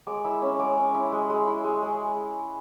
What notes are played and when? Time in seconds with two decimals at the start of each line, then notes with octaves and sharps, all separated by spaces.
0.07 G#3 D6
0.24 E4 E6
0.42 C#4 E6
0.59 G#3 D6
0.77 C#4
0.94 E4
1.12 G#3
1.30 G#3
1.48 E4
1.64 G#3
1.82 G#3